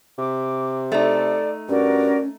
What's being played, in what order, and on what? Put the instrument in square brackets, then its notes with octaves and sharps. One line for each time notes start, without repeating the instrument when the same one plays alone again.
[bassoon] C3 [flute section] D6
[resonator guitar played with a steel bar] A3 D#4 [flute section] A4 D5
[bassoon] G2 [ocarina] C#4 [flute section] F#4 A#4 D5